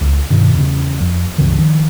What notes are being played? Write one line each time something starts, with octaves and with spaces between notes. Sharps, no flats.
C#2
G2 B2 D#3
E2 C#3
F2
G1 C#2 C#3 E3
D#3 F3